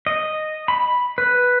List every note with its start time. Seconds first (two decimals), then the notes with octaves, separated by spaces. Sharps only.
0.07 D#5
0.68 B5
1.18 B4